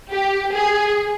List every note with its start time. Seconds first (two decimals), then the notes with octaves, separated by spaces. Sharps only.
0.12 G4
0.53 G#4